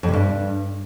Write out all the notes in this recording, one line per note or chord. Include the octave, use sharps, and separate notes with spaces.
F2
C3
G2